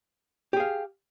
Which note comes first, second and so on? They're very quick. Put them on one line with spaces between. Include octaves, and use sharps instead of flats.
G4 G#4 F5